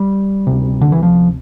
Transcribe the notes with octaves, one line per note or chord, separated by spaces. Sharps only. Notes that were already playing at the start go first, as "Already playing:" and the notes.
Already playing: G3
D2 C3
D3
E3
F3